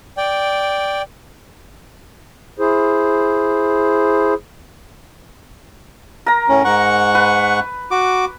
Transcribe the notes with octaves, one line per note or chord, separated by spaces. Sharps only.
D5 G5
E4 G#4 C5
A#4 A#5
A2 C#4
G#2 F#5 C#6
B4
F#4 D6